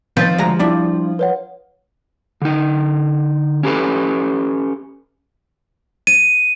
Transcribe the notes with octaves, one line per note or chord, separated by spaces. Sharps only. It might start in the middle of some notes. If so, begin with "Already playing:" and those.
D#3 F3 C4 B4 G6 A6
D2 G#3 A#5
G3 D4 E4
B4 C#5 F#5
D3 D#4
C#4 G4 A4 B4
D#7